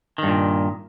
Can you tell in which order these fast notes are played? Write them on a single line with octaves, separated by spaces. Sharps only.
D#3 G2 A#2